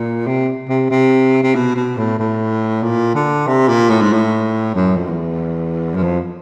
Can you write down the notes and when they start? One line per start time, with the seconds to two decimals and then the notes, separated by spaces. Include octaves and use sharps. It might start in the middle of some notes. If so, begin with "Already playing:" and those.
Already playing: A#2
0.27 C3
0.69 C3
0.90 C3
1.43 C3
1.55 B2
1.76 B2
1.98 A2
2.19 A2
2.83 A#2
3.15 D3
3.47 C3
3.68 A#2
3.90 A2
4.02 G#2
4.13 A2
4.75 F#2
4.97 F2
5.07 E2
5.95 F#2
6.03 F2